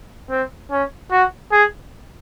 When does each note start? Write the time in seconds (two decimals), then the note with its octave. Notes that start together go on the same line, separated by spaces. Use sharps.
0.30 C4
0.71 C#4
1.11 F#4
1.52 G#4